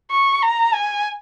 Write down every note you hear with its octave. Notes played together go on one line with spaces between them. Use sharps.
C#6
A#5
G#5